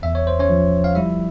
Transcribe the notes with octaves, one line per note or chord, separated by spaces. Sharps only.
E2 E5
C#5
C5
C#4 C#5
F3
F5
G3 E4 E5